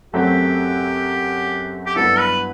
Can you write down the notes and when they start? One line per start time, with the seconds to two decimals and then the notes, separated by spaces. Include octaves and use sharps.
0.13 F#2 F#3 A3 C4 G4
1.86 G4
1.96 G2 F#3 B3 E4 A4
2.19 B4